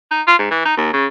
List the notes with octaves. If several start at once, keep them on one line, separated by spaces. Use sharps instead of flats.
D#4
F4
G#2
E3
D#4
D#2
C#3